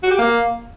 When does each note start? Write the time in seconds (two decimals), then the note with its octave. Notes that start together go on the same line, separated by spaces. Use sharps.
0.03 F#4
0.11 G4
0.18 A#3